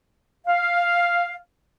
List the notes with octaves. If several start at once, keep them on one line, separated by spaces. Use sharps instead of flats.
F5